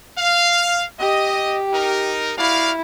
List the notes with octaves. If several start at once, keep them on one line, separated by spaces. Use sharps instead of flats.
F5
G4 D#5
D#4 A#4
E4 F#4 D5 F5